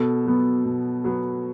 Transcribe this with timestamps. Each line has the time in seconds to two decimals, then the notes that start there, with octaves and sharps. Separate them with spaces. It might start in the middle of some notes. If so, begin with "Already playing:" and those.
Already playing: B2 A4
0.25 F#3 B3
0.64 B2
1.04 F#3 B3